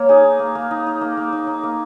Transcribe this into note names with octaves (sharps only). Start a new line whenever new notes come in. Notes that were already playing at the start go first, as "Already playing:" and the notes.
Already playing: A#3 C#5
D#4 G#4
D#4
A#3
A#3
D#4
D#4
A#3
A#3
D#4
D#4
A#3